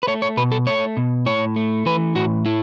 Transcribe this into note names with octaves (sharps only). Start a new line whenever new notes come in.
B4
A3 C#5
C#5
B2 B4
A4
A3 C#5
B2
A2 C#5
A3
E3 B4
A2 F#4
A3 E4